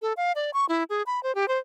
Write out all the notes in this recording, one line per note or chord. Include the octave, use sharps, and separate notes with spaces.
A4
F5
D5
C#6
E4
G#4
B5
C5
G4
C5